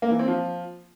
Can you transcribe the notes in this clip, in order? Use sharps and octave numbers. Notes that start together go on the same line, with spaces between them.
A#3
E3
C4
F3